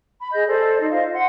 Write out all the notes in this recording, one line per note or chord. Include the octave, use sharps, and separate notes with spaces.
B5
G#4 D#5 G6
A4 C5 D5
D#4 D#5
F4 C5 D#5 F5
F#5 C6